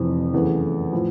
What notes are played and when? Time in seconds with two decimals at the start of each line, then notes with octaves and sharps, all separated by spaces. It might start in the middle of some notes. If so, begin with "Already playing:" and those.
Already playing: F1 F2 C3 E3
0.33 F#1 E2 C#3 E3 A3
0.93 A2 F3